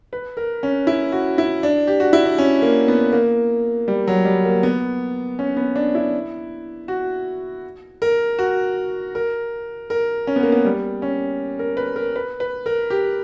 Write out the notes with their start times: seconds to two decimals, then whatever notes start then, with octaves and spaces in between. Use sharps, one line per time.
0.13 B4
0.37 A#4
0.63 C#4
0.87 E4
1.12 F#4
1.38 E4
1.63 D4
1.87 G4
2.00 F#4
2.13 E4
2.26 D4
2.38 C#4
2.62 A#3
2.88 B3
3.12 A#3
3.88 G3
4.07 F#3
4.25 G3
4.45 A#3
4.63 B3
5.39 C#4
5.57 B3
5.76 D4
5.95 E4
6.88 F#4
8.02 A#4
8.39 F#4
9.15 A#4
9.90 A#4
10.27 C#4
10.36 B3
10.43 A#3
10.52 B3
10.65 G3
11.02 C#4
11.59 A#4
11.77 B4
11.96 A#4
12.16 B4
12.40 B4
12.66 A#4
12.90 G4